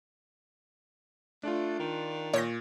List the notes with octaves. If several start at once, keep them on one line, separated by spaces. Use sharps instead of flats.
A3 D4 F4
D#3
A#2 C#5 G6 A#6